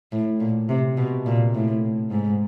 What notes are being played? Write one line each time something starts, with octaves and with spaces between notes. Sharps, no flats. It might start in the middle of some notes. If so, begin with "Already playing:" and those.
A2
A#2
C3
B2
A#2
A2
G#2